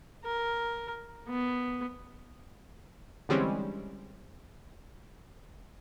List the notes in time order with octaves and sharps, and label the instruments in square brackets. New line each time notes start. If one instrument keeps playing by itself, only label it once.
[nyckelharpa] A#4
B3
[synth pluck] D3 E3 G3 G#3 C4 C#4